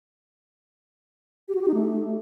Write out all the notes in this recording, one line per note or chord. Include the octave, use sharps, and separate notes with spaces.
G4
F#4
G4
D#4
A3